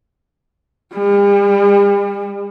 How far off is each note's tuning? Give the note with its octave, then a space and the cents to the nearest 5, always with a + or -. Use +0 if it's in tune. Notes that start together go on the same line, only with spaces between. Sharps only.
G3 +45